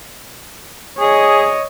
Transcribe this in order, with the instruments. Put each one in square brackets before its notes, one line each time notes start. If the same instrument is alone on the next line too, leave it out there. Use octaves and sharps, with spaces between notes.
[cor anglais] G#4 [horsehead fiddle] C#5 D#5